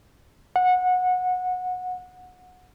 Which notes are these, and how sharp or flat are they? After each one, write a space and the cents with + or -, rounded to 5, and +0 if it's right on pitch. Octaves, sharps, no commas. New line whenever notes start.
F#5 -20